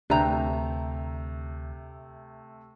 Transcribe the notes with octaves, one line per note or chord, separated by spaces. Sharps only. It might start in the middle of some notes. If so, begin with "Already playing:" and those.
D2 C3 A3 D4 B4 E5 G5 A#5